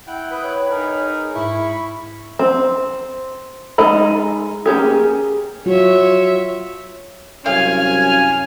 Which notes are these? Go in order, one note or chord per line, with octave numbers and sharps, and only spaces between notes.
E4 F#5 G5
B4 D#6
C#5
D#4 G#4 A#4
G#2 E4 B5 C#6
C4
G#3 D#4 D#5 B5
A#3 C#4 G4 G#4
F#3 F4 F#4 C#5 E5
C2 F#2 C#4 F5 G#5 F6